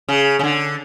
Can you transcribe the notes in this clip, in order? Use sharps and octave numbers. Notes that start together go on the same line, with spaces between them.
C#3
C#3
D3